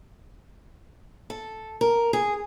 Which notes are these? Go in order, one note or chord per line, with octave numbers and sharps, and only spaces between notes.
A4
A#4
G#4